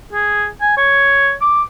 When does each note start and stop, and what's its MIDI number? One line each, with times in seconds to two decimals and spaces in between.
0.13 0.46 68
0.61 0.73 80
0.77 1.33 73
1.41 1.62 86